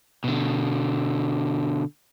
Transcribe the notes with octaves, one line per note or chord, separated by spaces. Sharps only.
B2 D3